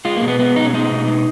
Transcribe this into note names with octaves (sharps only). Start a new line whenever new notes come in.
G#3 F4
A#3
B2
B3
G#3 B3
B2 D#4
C#4
G#3 D#4
B2
G#3